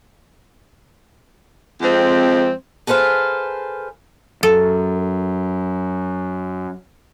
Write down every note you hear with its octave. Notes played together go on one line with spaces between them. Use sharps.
F2 G#3 C4
G#4 A4 B4 C5 F5
F#2 A4